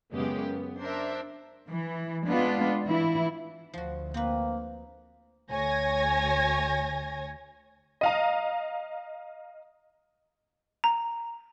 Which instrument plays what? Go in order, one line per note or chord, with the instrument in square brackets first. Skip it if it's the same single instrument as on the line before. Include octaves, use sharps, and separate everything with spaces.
[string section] F#2 C#3 G#3 B3 G4
B3
D4 A#4 C5 E5
[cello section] E3
G#3 B3 D4 F4
E3 E4
[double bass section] D2 [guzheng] F3 F#4
[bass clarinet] A#3 [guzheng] C4 B4
[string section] D2 C#5 G#5 G#6 A#6
[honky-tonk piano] D#5 F5 A#5
[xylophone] A#5